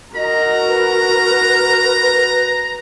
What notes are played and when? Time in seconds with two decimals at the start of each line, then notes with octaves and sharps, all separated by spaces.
0.16 F#4 A#4 D#5 A#5
0.68 B4